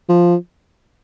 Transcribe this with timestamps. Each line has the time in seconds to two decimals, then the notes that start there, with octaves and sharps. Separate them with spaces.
0.09 F3